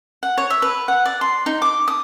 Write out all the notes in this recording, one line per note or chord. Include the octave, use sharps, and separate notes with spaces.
F#5
C#5
E5
B4
F#5
D5
C6
D#4
D6
D#6